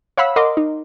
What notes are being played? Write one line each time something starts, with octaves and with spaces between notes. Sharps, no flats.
C#5 F5 F#5 B5 E6
A#4 D#5 F#5 C6 D6
D#4